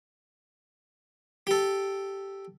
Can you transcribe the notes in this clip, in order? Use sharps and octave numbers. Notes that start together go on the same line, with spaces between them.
G4 A4